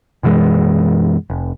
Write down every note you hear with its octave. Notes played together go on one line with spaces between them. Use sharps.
F#2 B2 E3 G#3
F1